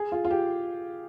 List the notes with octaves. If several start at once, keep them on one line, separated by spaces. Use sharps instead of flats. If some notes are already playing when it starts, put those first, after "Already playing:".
Already playing: G#4
F4
F4
G4